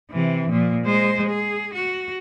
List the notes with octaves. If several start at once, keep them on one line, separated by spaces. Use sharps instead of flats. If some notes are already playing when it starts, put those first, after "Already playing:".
C3 E3
A#2 F3
G#3 C5
G#4
F#4